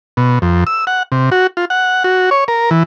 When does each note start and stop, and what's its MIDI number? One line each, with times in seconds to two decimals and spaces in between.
0.17 0.39 47
0.42 0.64 41
0.67 0.85 88
0.87 1.03 78
1.12 1.30 48
1.32 1.47 66
1.57 1.65 65
1.70 2.03 78
2.04 2.30 66
2.31 2.44 73
2.48 2.70 70
2.71 2.83 52